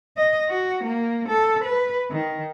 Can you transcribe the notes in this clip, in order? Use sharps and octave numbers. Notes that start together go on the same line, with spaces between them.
D#5
F#4
A#3
A4
B4
D#3